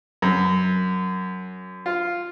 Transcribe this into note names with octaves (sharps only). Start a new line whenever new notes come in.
F#2
F4